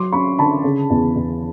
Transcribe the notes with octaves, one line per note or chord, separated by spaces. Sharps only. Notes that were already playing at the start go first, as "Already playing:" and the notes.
Already playing: F#3 C6 D6
C#4 B5 C#6
D3 A5 B5
C#3
E2
E2